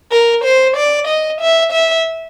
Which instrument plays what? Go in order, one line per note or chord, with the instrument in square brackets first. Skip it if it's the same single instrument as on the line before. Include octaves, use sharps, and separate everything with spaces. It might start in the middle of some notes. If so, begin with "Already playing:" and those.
[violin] A#4
C5
D5
D#5
E5
E5